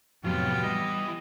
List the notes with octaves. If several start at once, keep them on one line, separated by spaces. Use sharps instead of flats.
C2 F2 A2 F#3 B3 F4 G4
E3 G3 D#5